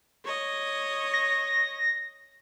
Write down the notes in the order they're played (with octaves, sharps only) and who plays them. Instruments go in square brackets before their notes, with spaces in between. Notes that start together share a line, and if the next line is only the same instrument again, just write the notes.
[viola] C#5 D#5
[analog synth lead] A#6